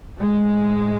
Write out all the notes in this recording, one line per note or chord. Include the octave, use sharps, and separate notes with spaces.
A2 G#3